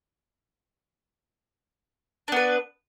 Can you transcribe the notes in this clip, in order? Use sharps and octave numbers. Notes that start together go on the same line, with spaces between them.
B3 D4 B4